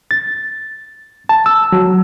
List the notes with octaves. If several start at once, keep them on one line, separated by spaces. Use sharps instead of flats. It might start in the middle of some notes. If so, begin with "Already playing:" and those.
A6
A5
E6
F#3